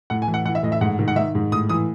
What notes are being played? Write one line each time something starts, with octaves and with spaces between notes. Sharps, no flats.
A2 F#5
G#5
E3
F#5
E3 F#5
E5
A2 D#5
E5
G#2 F#5
D#3
F#5
D#3 E5
G#2
A2 D#6
E3 D#6